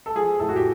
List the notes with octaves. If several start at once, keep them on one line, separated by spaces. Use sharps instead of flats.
A4
F3 G#4
A2 A4
F#4
G4